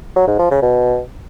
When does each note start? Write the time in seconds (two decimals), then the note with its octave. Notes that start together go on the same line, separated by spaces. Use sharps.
0.16 F#3
0.27 G#2
0.39 F3
0.51 C#3
0.62 B2